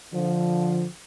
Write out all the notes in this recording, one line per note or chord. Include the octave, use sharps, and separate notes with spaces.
D3 F3